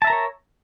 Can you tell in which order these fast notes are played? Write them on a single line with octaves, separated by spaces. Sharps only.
A5 E5 A#5 A#4 C#5